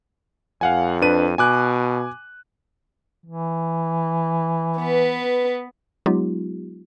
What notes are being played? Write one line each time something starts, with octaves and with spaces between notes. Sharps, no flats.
F2 F5 F#5 G#5
D4 B4 D#7
B2 G#5 D6 F#6
E3
B3 B4
F#3 G#3 B3 D#4 F4 G4